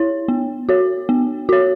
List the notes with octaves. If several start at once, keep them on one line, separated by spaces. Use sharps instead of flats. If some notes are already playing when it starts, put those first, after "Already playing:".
Already playing: E4 C#5
B3
F#4 C#5
B3
F#4 C#5